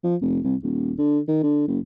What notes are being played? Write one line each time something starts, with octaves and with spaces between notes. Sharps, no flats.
F3
F1
C2
D#1
D3
D#3
D3
F#1